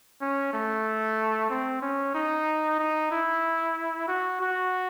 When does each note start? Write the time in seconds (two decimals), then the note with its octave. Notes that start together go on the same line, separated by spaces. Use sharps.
0.21 C#4
0.53 A3
1.50 C4
1.82 C#4
2.14 D#4
2.79 D#4
3.12 E4
4.08 F#4
4.41 F#4